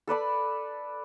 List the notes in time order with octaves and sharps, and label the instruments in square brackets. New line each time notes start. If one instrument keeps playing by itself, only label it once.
[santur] A4 B4 D5 B5